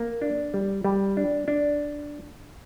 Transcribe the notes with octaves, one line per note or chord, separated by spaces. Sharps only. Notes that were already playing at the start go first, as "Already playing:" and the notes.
Already playing: A#3
D4
G3
G3
D4
D4